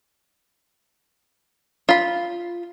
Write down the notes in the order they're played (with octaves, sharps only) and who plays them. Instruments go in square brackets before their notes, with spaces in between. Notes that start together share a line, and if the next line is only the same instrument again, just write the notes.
[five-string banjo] F4 B5